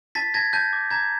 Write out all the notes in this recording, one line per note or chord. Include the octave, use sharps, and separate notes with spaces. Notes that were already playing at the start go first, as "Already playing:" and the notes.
A5 A6 B6
A5 G#6 A#6
A5 G6
D6
A#5 G#6